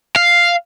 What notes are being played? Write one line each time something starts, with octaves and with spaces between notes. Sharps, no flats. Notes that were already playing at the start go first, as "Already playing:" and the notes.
F5